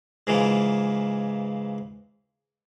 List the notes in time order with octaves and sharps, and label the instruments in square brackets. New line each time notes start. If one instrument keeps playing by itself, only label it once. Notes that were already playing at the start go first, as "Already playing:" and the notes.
[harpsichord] G#2 C#3 E3 F3 G#3 A#3